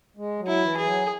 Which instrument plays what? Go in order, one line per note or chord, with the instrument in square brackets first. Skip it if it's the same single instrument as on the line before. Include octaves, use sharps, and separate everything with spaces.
[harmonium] G#3
F#3
[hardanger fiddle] E4
[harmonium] E3
[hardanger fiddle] G#4
[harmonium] F#3